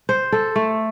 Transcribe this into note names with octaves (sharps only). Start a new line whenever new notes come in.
C5
A4
A3